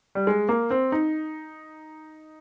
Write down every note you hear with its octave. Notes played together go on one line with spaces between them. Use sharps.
G3
G#3
A#3
C4
D#4